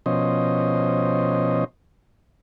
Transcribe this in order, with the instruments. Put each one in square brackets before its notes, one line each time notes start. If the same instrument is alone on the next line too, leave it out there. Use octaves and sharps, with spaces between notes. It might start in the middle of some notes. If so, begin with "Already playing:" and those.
[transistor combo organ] B2 F3 C#4 C5 D#5